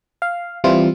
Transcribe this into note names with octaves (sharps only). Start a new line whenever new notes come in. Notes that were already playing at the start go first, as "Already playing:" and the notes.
F5
E3 G3 C4 E4 F4